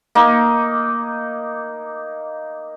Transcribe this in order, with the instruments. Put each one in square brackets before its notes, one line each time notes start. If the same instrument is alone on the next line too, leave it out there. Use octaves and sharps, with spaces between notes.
[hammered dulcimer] A#3 D#4